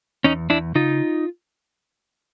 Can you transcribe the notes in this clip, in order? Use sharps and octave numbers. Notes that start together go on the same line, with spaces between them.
E2 C#4 D#4
E2 D4 E4
C#3 D#4 F4